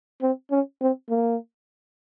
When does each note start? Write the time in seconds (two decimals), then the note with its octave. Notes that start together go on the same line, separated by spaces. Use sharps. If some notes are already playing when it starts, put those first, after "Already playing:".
0.22 C4
0.51 C#4
0.81 C4
1.09 A#3